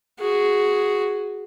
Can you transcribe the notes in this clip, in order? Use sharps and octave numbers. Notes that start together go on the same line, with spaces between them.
F#4 G#4